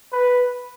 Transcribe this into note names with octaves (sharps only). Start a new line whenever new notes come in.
B4